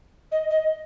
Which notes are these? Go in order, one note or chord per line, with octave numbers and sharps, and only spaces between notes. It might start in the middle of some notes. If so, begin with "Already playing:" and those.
D#5
D#5